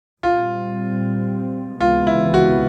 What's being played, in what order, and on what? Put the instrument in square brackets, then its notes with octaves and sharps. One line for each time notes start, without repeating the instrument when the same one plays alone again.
[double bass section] A#2 G3 C4 [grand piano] F4
[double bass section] C#2 C3 E3 G#3 B3 [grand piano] F4
[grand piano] E4
F#4